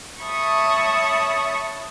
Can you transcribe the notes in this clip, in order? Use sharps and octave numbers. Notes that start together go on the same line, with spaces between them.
C#5 E5 A5 B5 C#6 D#6